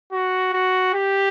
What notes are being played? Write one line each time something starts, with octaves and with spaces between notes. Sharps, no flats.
F#4
F#4
G4